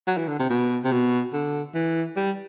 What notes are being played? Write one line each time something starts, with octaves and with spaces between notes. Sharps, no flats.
F#3
E3
D3
C3
B2
C3
B2
D3
E3
G3